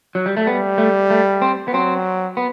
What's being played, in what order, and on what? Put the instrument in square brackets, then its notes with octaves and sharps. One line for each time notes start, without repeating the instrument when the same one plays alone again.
[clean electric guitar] F#3
G3
A3
[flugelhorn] G3 [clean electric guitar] B3
[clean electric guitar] A3
A3
C4
B3
[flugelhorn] F#3 [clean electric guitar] C4
[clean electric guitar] B3